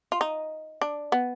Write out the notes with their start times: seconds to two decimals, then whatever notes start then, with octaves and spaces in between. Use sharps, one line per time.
0.12 F4
0.21 D#4
0.81 D4
1.12 B3